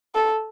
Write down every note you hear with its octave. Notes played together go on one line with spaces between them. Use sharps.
A4